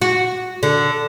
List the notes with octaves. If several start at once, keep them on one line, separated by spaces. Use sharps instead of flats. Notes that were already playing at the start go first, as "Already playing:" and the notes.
F#4
D3